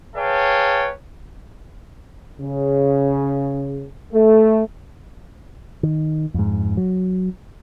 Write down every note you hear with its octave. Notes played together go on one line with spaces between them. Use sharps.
G#4 B4 C#5 F5 G5 A5
C#3
A3
D#3
F2 G#2
F#3